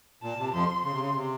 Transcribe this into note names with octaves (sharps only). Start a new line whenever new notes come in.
A#2 A5
C3
F2 F3 C6
C#3 C6
C3
C#3
C3